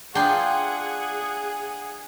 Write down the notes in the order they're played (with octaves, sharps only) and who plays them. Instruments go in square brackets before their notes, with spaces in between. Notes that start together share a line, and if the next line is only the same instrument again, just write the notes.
[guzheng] D4 F4 [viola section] G#4 F#5 [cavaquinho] G5 C6